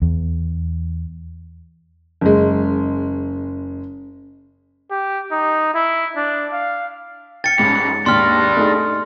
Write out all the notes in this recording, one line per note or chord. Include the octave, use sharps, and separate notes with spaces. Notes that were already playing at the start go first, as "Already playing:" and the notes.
E2
F#1 G#3
G4
D#4
E4
D4
F5
G5 F6 A6 C#7
F2 G#2 G3 C#4
D#2 G#2 D4 G4 C6 F6
A3 D#4 G#4